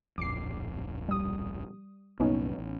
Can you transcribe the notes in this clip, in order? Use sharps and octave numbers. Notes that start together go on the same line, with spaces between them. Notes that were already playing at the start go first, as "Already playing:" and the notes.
D1 A#1 F2 D6 C7
G3 D#6
C2 F#2 A#2 B3 C#4 D#4
A1